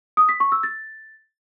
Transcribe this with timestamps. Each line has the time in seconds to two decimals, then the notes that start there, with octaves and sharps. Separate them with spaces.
0.17 D#6
0.29 B6
0.40 C#6
0.52 E6
0.63 A6